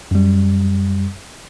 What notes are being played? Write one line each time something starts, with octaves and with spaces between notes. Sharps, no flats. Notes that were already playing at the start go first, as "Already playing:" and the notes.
F#2 G3